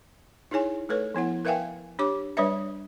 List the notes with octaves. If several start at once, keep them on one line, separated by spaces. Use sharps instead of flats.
D#4 E4 G#4 C#5 G#5
A3 A4 B4 C#5
F3 B3 E4 F#5
A#4 B4 E5 F5 G5 G#5
D4 G4 C#5 D6
G3 D4 B4 C#5 D5 E5